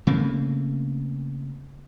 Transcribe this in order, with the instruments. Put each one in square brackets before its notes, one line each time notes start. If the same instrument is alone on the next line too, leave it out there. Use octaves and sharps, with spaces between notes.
[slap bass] C#3 A3 A#3 C4